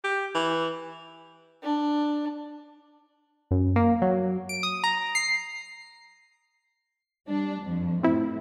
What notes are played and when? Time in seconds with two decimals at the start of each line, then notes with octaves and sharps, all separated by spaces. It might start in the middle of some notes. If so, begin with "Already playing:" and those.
0.04 G4
0.35 E3
1.63 D4
3.51 F#2
3.76 A#3
4.02 F#3
4.49 D7
4.63 D#6
4.84 A#5
5.15 C7
7.28 G3 D4
7.62 F2
8.03 A2 C4 E4